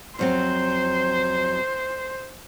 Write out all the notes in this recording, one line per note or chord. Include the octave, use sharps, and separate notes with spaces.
F2 F#3 C4 C5